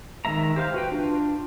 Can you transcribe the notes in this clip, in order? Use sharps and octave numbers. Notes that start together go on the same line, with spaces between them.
D#3 G#3 A3 E5 A#5
G4 C5 F5 G6
F#4 B4 G5
D4 F4